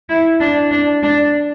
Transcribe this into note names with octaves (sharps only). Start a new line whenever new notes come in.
E4
D4
D4
D4